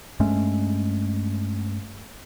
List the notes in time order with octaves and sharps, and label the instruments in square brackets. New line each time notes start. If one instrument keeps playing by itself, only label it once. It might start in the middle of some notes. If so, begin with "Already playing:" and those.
[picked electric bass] G2 G#3 A3 C#4